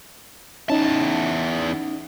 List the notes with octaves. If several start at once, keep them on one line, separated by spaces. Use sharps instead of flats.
E2 C#4 D#4 A5